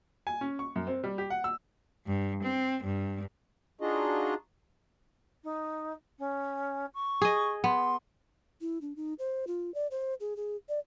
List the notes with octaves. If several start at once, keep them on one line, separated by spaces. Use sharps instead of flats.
G#5
C#4
C#6
F#2
C4
G3
G4
F#5
E6
G2
C4
G2
D4 D#4 F4 F#4 G#4 D#5
D#4
C#4
C#6
G#4 D#5
B3 C6
E4
D4
D#4
C5
F4
D5
C5
G#4
G#4
D5